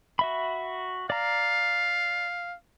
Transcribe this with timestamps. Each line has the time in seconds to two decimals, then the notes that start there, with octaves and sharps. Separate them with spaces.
0.19 F#4 E5 B5
1.10 D5 F5 A#5